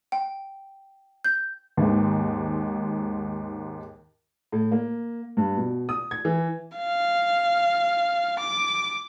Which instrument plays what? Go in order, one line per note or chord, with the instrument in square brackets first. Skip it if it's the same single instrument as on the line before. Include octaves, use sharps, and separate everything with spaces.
[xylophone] G5
G6
[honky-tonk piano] D#2 G#2
[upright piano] A2
A#3
G2
B2
D#6
G#6
E3
[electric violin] F5
D6